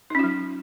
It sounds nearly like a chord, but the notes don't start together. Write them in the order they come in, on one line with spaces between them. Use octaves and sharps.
D#4 C#4 F4 F#3